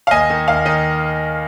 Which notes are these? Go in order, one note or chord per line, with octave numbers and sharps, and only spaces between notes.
F5
D#2 D#5 G#5
D#3
D#2 F5
D#3 D#5